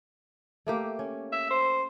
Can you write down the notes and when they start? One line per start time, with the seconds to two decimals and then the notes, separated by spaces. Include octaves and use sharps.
0.67 A3 A#3 G4
0.99 C#4
1.32 E5
1.51 C5